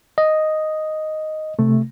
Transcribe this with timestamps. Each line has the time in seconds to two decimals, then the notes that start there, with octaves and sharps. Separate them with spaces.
0.18 D#5
1.59 C3 A3